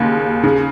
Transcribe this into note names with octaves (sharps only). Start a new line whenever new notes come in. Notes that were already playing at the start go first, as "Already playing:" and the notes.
Already playing: D#2 C#3
C#3